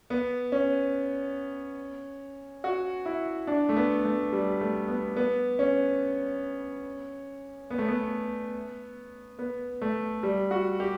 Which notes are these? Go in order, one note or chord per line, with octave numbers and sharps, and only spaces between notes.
B3
C#4
F#4
E4
D4
A3
B3
A3
G3
A3
B3
B3
C#4
B3
A3
B3
B3
A3
G3
F#4
G4